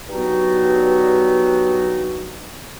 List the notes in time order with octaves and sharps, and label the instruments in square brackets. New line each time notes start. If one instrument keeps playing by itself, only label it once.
[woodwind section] G2 F#3 B3 D#4 F#4